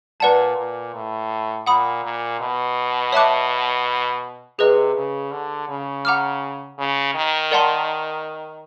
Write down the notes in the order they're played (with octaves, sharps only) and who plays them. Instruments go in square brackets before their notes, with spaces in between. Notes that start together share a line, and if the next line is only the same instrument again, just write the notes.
[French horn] A#2 [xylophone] B4 D5 F#5 A5
[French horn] A#2
A2
[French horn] A#2 [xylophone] F#5 B5 D#6
[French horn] A#2
B2
[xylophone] C#5 E5 A5 D6 F#6
[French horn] C3 [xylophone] G#4 B4 D#5
[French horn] C#3
D3
C#3
[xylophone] F#5 A#5 D6 F6
[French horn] C#3
D#3
[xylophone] A#4 D5 F#5 A5 C6